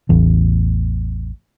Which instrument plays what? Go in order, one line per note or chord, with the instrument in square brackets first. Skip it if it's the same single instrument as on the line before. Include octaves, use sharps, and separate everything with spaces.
[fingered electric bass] A1 E2